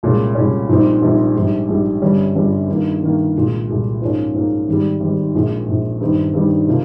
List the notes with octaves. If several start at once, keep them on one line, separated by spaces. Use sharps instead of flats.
C2 A#2 G#3 C#4
C2 A#2 G#3 C#4
A#1 A#2 G3 C4 D#4
A#1 A#2 G3 C4 D#4
A#1 G#2 G3
A#1 G#2 G3
G1 G2 G3 C#4
G1 G2 G3 C#4
G2 D#3 A#3
G2 D#3 A#3
C2 A#2 G#3
C2 A#2 G#3
G#2 F3 A#3 C#4
G#2 F3 A#3 C#4
G#1 G#2 G3
G#1 G#2 G3
A#1 A#2 G#3
A#1 A#2 G#3
G2 D#3 G3 C4 D#4
G2 D#3 G3 C4 D#4
C3 F3 A#3